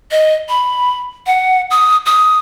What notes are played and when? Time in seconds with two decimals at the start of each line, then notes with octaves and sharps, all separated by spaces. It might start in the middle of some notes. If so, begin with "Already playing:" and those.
0.11 D#5
0.49 B5
1.27 F#5
1.70 D#6
2.06 D#6